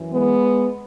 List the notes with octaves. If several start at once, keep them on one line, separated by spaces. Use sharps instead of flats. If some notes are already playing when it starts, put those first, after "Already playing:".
Already playing: F#2 E3
G#3 B3